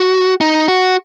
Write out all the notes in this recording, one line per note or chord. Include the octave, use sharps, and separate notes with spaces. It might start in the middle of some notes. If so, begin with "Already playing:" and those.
Already playing: F#4
D#4
F#4